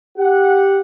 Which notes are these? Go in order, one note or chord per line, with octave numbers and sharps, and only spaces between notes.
G4 F#5